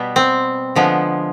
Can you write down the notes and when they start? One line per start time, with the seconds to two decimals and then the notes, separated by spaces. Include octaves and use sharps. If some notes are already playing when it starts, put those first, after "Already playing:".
Already playing: B2 G3 B3
0.16 C4
0.76 D3 F3 G#3 B3